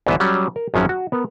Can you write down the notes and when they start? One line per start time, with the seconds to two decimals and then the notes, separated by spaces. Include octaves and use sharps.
0.06 C2 G#2 E3 B3 B4 E5
0.20 F#3 G3 C#4
0.56 A#4
0.74 G#1 F#2 F3 F#3 C#4
0.89 F#4
1.12 B3 A#4